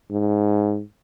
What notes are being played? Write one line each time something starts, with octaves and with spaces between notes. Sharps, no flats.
G#2